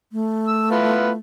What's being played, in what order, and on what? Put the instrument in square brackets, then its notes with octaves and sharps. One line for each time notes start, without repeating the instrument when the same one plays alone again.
[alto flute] A3
[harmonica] E6
B3 E4 F4